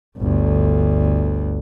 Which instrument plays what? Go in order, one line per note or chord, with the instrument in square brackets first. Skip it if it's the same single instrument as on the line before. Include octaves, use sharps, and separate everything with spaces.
[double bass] G1 D2